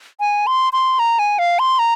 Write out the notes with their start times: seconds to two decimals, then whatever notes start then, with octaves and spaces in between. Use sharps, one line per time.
0.20 G#5
0.47 C6
0.73 C6
0.99 A#5
1.19 G#5
1.39 F5
1.59 C6
1.79 A#5